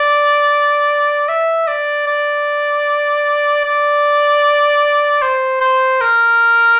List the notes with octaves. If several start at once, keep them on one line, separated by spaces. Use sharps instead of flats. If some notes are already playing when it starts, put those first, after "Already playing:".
Already playing: D5
E5
D5
D5
D5
C5
C5
A#4